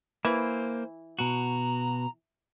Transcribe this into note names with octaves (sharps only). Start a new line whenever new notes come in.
E3 A#3 C5
B2 F#4 A#5